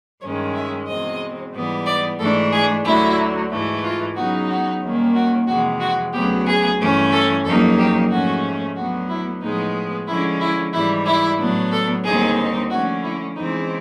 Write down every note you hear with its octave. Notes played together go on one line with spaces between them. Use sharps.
G2 D#3 G#3 C#4 C#5
E5
E2 B2 G#3 C4 D#5
G#2 E3 G3 B3
D5
G#2 E3 A3 D4 A4
G#4
D2 D3 F#3 E4
G#2 E3 A3
F4
C#3 F#3 B3 D#4 F#4
F#4
D#2 D#3 G3 A#3 C#4
F#4
F2 C3 E3 G#3 F#4
F#4
D2 C#3 F#3 B3 G4
G#4
G2 E3 A3 C#4
A4
F2 C#3 F#3 A#3 D#4 A4
G4
G#2 F3 A3 C#4 F#4
D2 D3 F#3 B3 F#4
E4
A2 F3 G#3 B3 D#4
D3 F3 G#3 C#4 E4
E4
G#2 E3 G3 E4
E4
A2 F#3 B3 D4
A4
D#2 D3 G3 C4 D#4 G#4
D3 F3 A3 C#4 F#4
E4
E2 C#3 E3 G#3 C4 D#4